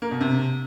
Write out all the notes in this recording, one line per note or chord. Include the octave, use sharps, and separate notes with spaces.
A#3
B2
C3